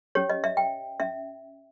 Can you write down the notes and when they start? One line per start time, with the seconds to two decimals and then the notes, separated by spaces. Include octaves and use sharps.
0.15 C#4 G4 C#5
0.30 D#5
0.44 E5
0.57 G5
1.00 C#4 E5